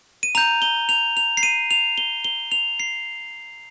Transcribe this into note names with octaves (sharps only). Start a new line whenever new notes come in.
D#7
A#5 G6 F7
G7
F7
F7
C7
D#7
F7
G7
G7
F7
C7